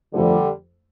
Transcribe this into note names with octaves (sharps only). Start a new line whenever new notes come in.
F2 D3 F3 G3 A3